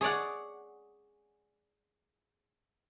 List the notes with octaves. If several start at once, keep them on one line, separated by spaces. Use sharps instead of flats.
G#4 C#5 D5 F#5